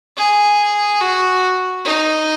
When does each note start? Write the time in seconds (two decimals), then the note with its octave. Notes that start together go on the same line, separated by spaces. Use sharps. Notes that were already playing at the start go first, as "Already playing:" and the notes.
0.17 G#4
1.01 F#4
1.85 D#4